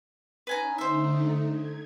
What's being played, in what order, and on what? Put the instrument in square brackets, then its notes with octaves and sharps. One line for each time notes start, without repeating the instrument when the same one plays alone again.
[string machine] C#4 D#4 [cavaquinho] B4 G#5 A#5
[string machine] D3 A3 D#4 [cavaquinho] C5 E5
[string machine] G#6